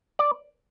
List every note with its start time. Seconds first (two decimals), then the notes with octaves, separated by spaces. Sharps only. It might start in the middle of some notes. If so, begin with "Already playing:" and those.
0.19 D5